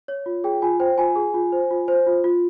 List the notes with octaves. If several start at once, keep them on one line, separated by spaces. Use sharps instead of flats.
C#5
F4
G#4 G5
F4 G#5
C5 G5
F4 G#5
G#4
F4
C5
F4
C5
F4
F4